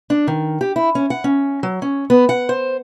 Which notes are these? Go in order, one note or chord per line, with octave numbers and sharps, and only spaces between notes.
D4
D#3
G4
E4
C#4
F#5
C#4
F#3
C#4
B3
F#5
C5